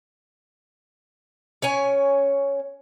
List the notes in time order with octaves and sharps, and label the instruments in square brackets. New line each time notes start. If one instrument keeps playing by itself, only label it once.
[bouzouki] C#4 C#5 G#5